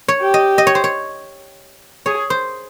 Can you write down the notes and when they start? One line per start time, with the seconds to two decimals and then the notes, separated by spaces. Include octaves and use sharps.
0.08 C#5
0.21 G4
0.34 D#5
0.58 D#5
0.67 C#5
0.75 C5
0.84 C#5
2.06 G#4 C#5
2.30 C5